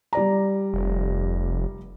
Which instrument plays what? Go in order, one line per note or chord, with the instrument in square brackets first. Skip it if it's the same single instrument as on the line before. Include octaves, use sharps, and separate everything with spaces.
[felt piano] G3 D5 A#5
[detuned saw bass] F1